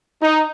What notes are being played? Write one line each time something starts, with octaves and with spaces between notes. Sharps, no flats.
D#4